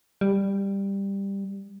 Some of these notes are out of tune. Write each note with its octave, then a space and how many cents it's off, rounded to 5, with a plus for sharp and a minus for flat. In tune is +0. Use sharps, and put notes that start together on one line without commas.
G3 +10